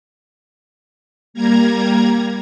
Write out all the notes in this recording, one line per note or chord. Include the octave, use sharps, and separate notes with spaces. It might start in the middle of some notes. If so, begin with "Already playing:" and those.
G3 A#3 A#5 G#6